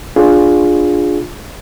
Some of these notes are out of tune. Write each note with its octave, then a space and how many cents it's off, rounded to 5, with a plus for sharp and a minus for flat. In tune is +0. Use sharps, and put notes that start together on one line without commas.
D4 +0 F4 +15 G#4 +0